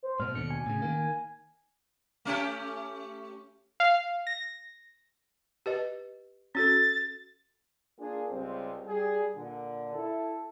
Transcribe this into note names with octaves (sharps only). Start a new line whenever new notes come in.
C5
G#2 B2 F6
D#2 B2 D3 C#7
G#5
A2 C#3
D#3 A#3 G#5
A3 C#4 G4
F5
A#6
G4 B4 D#5
C#4 F#4 A4 A6
A#3 D4 F4 G#4
C#2 G3 C4
G3 G#4
A#2 D3
E4 A4